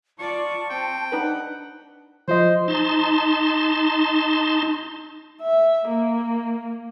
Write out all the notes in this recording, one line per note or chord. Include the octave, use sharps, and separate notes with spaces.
F4 D5 A5 C#6
C4 G5
D4 D#4 B4 F#5
F3 F4 C5 D#5
D#4 A5 C6
E5
A#3